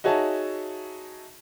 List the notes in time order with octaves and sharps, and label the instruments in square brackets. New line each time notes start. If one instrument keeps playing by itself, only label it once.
[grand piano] D#4 F#4 G#4 C#5 E5 A5